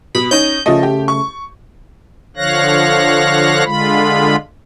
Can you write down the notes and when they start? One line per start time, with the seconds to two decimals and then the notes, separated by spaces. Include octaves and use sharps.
0.15 B2 B5
0.31 C#4 D#4 G6
0.66 C#3 F3 A3 D#5
0.83 G4
1.08 C#6
2.37 D3 F3 C#5 F5 F#6 A#6
3.65 D3 G#3 F4 B5